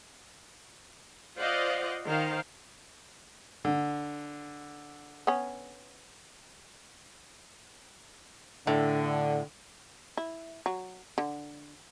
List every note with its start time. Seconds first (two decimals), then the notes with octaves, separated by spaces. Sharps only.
1.37 F4 C5 D5 D#5 F5 F#5
2.06 D#3 C5 F5
3.65 D3
5.27 B3 C#4
8.67 A2 D3
10.17 E4
10.66 F#3
11.18 D3